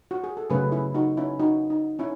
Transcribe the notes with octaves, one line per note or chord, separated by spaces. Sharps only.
F#4
G#4
A4
C#3 F#3 A3 C#4 G#4 B4
E4 G#4
D#4 F#4
C#4 E4
D#4 F#4
D#4
C#4 E4